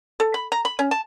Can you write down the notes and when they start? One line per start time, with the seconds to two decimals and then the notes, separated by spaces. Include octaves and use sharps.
0.20 A4
0.34 B5
0.52 A#5
0.65 B5
0.79 C#4
0.91 A5